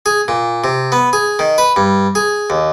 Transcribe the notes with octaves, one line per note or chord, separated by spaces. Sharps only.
G#4
A#2
C3
B3
G#4
D#3
B4
G2
G#4
D#2